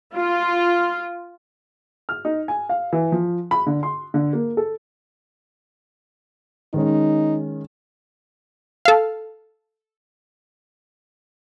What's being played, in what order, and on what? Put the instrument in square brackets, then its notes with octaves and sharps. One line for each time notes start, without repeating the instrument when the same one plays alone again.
[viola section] F4
[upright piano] F6
D#4
G#5
F5
E3
F3
B5
D3
C6
D3
A#3
A4
[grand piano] D#3 G#3 C#4 [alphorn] D#4
[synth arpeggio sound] A4 F5